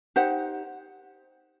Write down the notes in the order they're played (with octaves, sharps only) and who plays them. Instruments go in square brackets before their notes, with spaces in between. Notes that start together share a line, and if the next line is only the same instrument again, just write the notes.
[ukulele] D#4 G4 C5 F#5